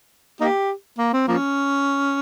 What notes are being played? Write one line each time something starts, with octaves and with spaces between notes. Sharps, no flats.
A#3 D#4 G4
A#3
C4
F3 A#3 C#4